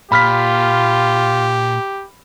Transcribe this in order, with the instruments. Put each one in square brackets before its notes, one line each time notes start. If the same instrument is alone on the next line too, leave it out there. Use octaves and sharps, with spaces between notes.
[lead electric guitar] A#2 [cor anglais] F4 [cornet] G4 [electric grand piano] B5 F6 B6